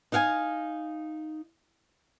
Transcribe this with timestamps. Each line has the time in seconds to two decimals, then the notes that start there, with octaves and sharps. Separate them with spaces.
0.12 D#4 D#5 F5 F#5 G#5